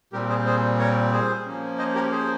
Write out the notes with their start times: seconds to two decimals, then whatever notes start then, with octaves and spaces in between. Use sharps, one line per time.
0.13 A#2 G3 C4 G4 A#4
0.30 G#4 C5
0.46 G#4 C5
0.79 A#4 C#5
1.12 G#4 C5
1.46 F3 A#3 C#4
1.78 C5 D#5
1.95 G4 A#4
2.11 G#4 C5